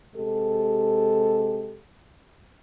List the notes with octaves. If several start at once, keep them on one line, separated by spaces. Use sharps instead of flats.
C3 G#3 G4 A4